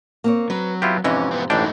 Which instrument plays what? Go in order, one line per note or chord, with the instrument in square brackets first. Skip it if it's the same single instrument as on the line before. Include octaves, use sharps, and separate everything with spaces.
[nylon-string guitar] A#3 C4 C#5
[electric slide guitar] F#3 [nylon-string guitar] C4 [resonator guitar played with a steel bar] B4
[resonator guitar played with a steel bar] B3 [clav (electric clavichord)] E4 F4 G4
[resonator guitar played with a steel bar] F2 G#2 C3 [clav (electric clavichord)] E3 [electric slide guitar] C#4
[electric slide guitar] B3 C4
[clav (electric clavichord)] A1 D4 G5 [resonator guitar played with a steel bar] G#2 E3 [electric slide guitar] A3 D#4